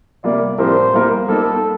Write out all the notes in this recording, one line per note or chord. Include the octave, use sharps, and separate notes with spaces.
C3 G3 A#3 F4 D5
A2 F3 C4 G4 A#4 C5
G3 A#3 F4 A#4
G3 A#3 D#4 A4